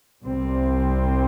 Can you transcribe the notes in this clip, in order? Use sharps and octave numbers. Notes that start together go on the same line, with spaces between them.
C2 C3 G3 C4